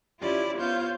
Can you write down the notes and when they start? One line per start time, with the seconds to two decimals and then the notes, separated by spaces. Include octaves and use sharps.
0.20 C#4 E4 F4 G4 D5
0.59 B3 F4 C5 C#5 F5 G6